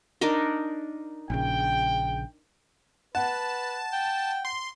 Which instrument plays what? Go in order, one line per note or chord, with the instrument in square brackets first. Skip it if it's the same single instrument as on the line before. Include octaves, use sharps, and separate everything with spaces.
[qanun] D4 D#4 A#4
[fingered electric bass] A#1 C#3 [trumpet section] G5
[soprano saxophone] B4 [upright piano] F#5 [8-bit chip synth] A5
[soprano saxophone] G5
[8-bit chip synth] C6